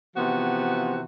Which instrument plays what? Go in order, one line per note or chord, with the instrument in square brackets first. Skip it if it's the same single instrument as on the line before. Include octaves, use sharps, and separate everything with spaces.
[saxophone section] C3 E3 F3 B3 F#4